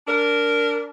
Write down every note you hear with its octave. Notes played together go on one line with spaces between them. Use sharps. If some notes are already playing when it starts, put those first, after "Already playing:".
D4 A#4